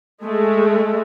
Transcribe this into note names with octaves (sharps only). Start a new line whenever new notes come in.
G#3 A3